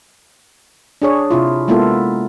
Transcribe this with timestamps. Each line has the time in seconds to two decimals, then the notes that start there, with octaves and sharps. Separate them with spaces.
1.02 D4 G#4 C#5
1.31 C3 E4 F4
1.68 G#3 A#3 B3 E4 F4 A4